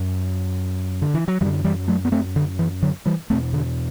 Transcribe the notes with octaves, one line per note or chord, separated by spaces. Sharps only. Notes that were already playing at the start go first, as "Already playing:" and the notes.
Already playing: F#2
D3
E3
F#3
F#2 D3 E3 G3
E3 G3
F#3 A3
B3
A3 C4
D3
E3
D3 F#3
E3 G3
E2 B2 A3 C4
D3